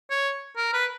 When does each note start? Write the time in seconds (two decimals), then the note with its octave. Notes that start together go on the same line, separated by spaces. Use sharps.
0.10 C#5
0.57 A#4
0.74 B4